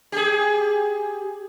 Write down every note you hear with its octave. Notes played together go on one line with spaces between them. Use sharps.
G4 G#4